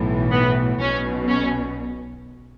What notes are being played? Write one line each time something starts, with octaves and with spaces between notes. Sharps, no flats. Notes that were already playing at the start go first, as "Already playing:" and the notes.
Already playing: B1 A2 E3
B3
B1 B2 C#4
C#4